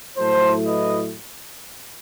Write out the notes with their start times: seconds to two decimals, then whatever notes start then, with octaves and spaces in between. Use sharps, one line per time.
0.17 A2 F#3 A3 E4 A4 C5
0.67 B4 D#5